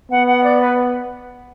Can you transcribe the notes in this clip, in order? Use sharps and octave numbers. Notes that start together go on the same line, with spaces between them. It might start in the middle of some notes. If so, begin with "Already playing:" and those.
B3 F#5
F#5
D5
B4